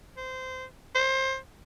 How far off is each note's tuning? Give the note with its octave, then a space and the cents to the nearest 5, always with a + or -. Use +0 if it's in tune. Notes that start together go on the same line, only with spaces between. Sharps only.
C5 -20
C5 +20